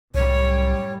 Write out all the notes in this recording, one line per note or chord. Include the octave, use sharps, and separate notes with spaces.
C2 F#2 A2 G3 C#5